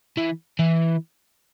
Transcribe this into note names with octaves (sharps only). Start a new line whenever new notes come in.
E3
E3